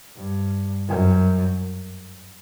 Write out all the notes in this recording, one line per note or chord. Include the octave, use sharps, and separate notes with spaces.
G2
F#2